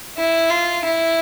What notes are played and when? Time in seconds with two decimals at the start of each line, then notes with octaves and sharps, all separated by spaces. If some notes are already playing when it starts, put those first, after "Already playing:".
0.17 E4
0.50 F4
0.84 E4